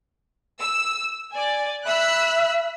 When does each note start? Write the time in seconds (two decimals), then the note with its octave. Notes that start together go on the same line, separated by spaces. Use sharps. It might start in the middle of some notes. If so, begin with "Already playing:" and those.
0.60 E6
1.31 D5 G#5
1.86 E5 B5 E6 F#6